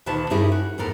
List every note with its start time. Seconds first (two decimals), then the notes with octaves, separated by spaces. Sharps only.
0.06 D2 A#2 D#3 B4 A5
0.30 G2 G3 C#4 E4 G#4 A#4
0.52 F#4
0.78 E2 A2 A4 A#4